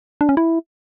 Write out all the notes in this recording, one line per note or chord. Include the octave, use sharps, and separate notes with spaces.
D4
C#4
E4